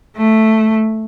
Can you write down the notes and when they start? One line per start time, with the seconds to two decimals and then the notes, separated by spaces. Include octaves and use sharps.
0.16 A3